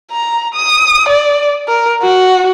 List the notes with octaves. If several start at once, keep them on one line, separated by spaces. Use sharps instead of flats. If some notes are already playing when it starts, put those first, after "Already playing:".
A#5
D#6
D5
A#4
F#4